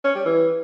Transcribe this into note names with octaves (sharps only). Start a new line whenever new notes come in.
C#4
G3
E3